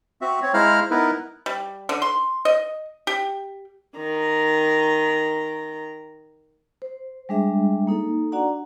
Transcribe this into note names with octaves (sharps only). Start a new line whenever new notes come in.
C4 F#4 E5
C4 C#5
G#3 E4 C5 F5 A#5 F6
B3 D#4 E4 A#4 B4
G3
D3
C6
D#5
G4
D#3 A#5
C5
G3 G#3 D4 G#4 E5
A#3 D#4 A4
D4 F#4 D5 F#5 A#5